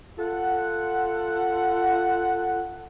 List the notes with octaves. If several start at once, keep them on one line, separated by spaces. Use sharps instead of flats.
F4 A4 F#5